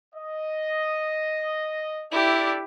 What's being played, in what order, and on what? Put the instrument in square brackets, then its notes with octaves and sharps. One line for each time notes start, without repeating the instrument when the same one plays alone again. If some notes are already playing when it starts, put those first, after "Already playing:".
[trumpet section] D#5
[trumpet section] D4 A4 D5 [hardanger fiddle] E4 G4